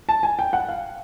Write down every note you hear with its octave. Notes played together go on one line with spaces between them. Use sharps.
A5
G#5
G5
F#5
F5